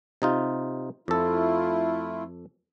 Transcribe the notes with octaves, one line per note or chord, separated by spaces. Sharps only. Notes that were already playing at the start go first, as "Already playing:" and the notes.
C3 D#4 F4
F2 A3 E4 F4 A4